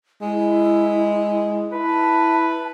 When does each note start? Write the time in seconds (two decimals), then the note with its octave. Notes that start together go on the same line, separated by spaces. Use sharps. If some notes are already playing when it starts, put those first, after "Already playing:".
0.22 G#3 E4
1.72 E4 B4 A5